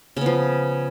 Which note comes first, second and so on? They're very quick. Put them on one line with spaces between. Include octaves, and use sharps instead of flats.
C#3 B3 F3